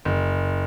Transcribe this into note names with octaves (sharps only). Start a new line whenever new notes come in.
F#1